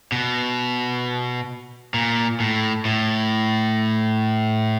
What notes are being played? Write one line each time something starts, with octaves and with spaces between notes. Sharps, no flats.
B2
A#2
A2
A2